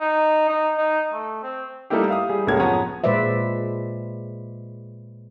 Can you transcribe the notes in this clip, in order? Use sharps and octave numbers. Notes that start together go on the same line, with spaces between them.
D#4
D#4
D#4
A3
C4
G3 A3 A#3 D#4 E4 G4
E5 F5 D#6
G3 G#4
C#2 A2 G#3 A#3 G#6
F#2 F3 B3 G#4 C#5 A#5
A#2 G#3 B4 C5 D5 E5